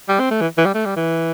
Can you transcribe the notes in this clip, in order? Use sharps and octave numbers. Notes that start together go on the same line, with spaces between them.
G3
C4
A3
E3
E3
G3
A3
G3
E3